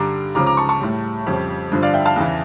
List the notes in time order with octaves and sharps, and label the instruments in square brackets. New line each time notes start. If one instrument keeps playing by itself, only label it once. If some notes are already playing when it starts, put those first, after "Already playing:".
Already playing: [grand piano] G2 D3 G3 A#5 D6
C#2 C#3 F3 A#5 D6
A#5 D6
A5 C#6
A5 C#6
A2 G3
F2 C#3 G3
G2 D3 F3
D5 F5
E5 G5
F5 A5
E2 C#3 E3